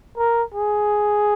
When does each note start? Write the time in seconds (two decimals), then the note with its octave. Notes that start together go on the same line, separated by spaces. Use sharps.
0.18 A#4
0.54 G#4